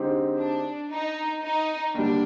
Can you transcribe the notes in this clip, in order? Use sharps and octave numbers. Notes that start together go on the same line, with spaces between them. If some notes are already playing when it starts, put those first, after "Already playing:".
Already playing: D3 G#3 C4 D#4 G4
D4
D#4
D#4
D#2 D3 G3 D4